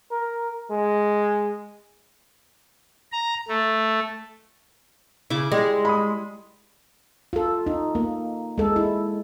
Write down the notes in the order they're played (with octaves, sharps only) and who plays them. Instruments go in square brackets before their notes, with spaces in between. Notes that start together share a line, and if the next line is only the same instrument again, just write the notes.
[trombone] A#4
G#3
[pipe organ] A#5
A3
[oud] C#3 [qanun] E4 D6
[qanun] G3 [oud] G#3
[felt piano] B5 C6 D#6
[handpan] F4 A4
D#4
A#3
G#3 A4
E4